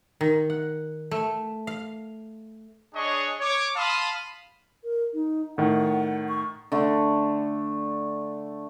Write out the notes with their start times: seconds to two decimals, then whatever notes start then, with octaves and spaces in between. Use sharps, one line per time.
0.21 D#3
0.50 F#5
1.11 A3
1.67 F5
2.95 D4 G#4 C#5 D#5 C#6
3.40 C#5 D6
3.76 F5 A5 B5 C6 D#6
4.84 A#4
5.14 D#4
5.58 A2 D#3 F#5
6.28 C#6
6.72 D3 A3